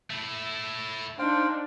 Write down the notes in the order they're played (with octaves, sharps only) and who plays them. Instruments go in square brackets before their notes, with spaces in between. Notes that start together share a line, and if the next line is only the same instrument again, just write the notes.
[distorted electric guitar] A3 E4
[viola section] D4 D#4 [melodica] C5 F5 G5